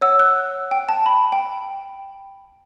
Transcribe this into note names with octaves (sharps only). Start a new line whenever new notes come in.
C#5 F#5 E6
F#6
G5
A5
B5
G5